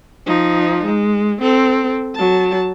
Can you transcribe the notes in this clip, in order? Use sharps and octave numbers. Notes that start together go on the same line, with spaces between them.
F3 D#4
G#3
C4 A4
F#3 A5